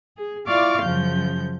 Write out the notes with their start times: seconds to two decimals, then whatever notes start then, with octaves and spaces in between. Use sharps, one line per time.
0.16 G#4
0.46 E4 F4 D5 F5 C#6 D6
0.81 F#2 C#3 F3 G6